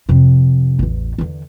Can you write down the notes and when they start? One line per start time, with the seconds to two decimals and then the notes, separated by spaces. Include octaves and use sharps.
0.09 F2 C3
0.79 A1 E2
1.18 E2 D3